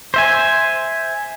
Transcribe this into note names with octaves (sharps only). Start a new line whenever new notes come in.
C5 E5 G#5